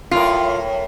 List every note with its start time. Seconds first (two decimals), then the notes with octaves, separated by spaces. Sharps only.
0.11 F#2 A2 F4 A#4